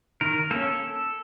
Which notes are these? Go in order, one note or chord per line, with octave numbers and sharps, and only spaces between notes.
D#3 A#4
A#3 C#4 A4